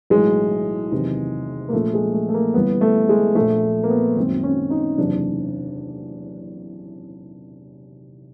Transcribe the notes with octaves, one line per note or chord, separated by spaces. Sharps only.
B1 A2 E3 G#3
F#1 E2 C3 D#3
A#3
A#1 A#2 A3
G#3
A3
A3
A#3
G1 G2 E3 B3
A3
G#3
A#1 A#2 A3
A#3
B3
G#1 F#2 D#3 C4
C#4
D#4
F#1 E2 C3 D4